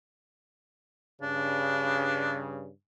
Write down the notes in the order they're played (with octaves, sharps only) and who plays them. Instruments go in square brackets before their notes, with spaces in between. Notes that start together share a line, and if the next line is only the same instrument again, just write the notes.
[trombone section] G2 C#3 [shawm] D4